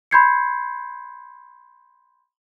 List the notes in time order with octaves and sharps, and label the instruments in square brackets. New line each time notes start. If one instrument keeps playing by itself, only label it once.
[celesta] B5 C6 G6 G#6 C7 C#7